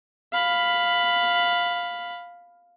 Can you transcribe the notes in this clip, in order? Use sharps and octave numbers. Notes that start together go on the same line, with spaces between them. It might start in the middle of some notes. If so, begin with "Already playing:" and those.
F5 B5